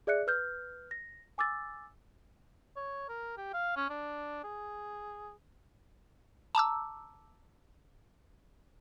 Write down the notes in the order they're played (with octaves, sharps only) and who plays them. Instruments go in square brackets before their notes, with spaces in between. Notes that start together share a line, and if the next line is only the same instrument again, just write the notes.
[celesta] G#4 D5 E5 F#6 C#7
B4 F6 G6
A#6
G#5 D6 E6 A6
[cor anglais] C#5
A#4
G4
F5
C#4
D4
G#4
[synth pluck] A5 A#5 D6 E6